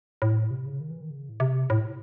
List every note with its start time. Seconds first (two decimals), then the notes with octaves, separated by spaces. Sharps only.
0.22 A2
0.51 C3
0.66 C#3
0.80 D#3
0.90 E3
1.01 D#3
1.11 C#3
1.29 A2
1.40 C3
1.70 A2